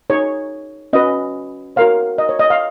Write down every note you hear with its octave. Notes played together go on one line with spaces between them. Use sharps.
D#4 G#4 C#5
C#4 F#4 B4 D#5
F#4 A#4 C#5 F5
D#5
C#5
D#5
F5